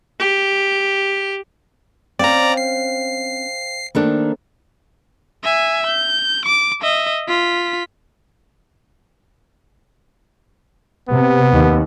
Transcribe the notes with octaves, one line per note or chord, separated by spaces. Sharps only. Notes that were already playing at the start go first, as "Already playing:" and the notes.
G4
C4 C#4 C5 D5 F5 G5 A#5
C7
D#3 A3 A#3 D4 A4 C5
E5 G#5
G6
D6
D#5 E5
F4 B6
C3 B3
D#2